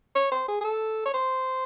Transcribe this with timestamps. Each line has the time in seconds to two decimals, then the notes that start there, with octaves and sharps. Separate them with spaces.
0.15 C#5
0.32 C5
0.48 G#4
0.61 G#4
0.64 A4
1.06 C#5
1.14 C5